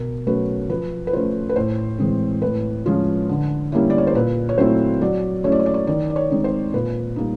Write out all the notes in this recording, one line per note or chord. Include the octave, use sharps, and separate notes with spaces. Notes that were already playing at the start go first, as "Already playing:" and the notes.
Already playing: B2 A#4
F#3 A3 C#4 B4
F3 B4
B4
A3 C#4 F4 C5
B4
A2 C5
E3 G#3 C4
A2 B4
F3 G#3 C#4 F4
D3
G3 A#3 C#4 E4
D5
C#5
C5
A#2 B4
C#5
F#3 A3 C4 E4 C5
F#3 D5
A3 C#4 E4 C#5
D5
C#5
D5
C#5
D#3 D5
D5
C#5
G#3 C4 D#4
C5
A#2 B4
G3 A#3 D#4